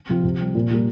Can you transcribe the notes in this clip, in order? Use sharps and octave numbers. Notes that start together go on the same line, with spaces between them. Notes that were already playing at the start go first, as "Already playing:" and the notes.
C3 F3 C4 F4
C3
G3 C4
A#2
G3 A#3 F4